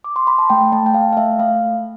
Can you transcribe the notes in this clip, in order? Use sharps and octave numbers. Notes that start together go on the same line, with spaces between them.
D6
C6
B5
A5
A3 G5
G5
A3 A5
G5
A3 F5
F5
A3 E5
A3 F5